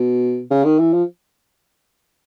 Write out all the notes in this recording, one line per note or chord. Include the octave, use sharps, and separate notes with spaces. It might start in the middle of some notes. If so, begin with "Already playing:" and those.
Already playing: B2
C#3
D#3
E3
F3